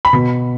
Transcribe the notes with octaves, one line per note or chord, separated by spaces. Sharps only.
B5
B2